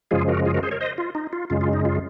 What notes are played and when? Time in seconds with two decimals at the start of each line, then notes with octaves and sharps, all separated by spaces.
0.11 F#2 C#3 F3 G#3 F4 G#4
0.28 F#4 A#4
0.45 F4 G#4
0.54 F#4 A#4
0.63 G#4 C5
0.71 A#4 C#5
0.81 C5 D#5
0.98 F4
1.15 D#4
1.33 F4
1.50 F#2 C#3 G#3 F4
1.61 F4
1.73 D#4
1.85 F4